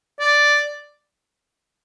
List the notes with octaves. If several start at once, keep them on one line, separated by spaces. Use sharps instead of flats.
D5